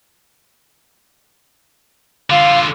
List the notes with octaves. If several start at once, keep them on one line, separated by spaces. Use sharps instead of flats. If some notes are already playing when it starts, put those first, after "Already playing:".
D3 F4 F5